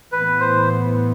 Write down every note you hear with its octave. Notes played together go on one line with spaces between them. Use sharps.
A2 E3 B3 B4
C5